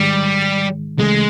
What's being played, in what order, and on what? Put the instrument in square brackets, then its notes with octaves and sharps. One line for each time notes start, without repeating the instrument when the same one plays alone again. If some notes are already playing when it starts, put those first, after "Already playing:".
Already playing: [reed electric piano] G#2 D#3 G#3 [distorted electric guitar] G3
[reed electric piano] D2 C#3 E3 A3 [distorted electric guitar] G#3